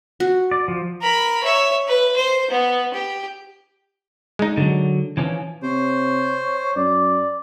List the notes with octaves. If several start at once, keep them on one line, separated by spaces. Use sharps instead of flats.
F#4
D5
F3
A#4 B5
C#5 E5
B4
C5
B3
G4
G#3 D#4
D3 F#3
E3 F3 C#4
C3 C5 C#5
F#2 D5